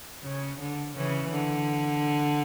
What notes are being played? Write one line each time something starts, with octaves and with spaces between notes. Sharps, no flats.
C#3
D3
C#3 E3
D3